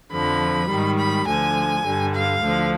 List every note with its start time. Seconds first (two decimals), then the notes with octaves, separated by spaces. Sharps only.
0.12 F2 D3 F3 B5
0.69 G#2 D#3 G3
0.97 B5
1.26 D2 D3 F3 G#5
1.84 G2 D3 G3
2.13 F5
2.42 D2 D3 F3